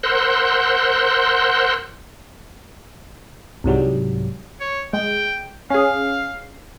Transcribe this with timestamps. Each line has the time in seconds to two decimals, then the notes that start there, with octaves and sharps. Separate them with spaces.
0.03 A#4 C5 F#5 C6 E6 F#6
3.64 C2 G#2 F#3 G3
4.60 C#5
4.93 G#3 G5
5.70 C#4 G#4 F5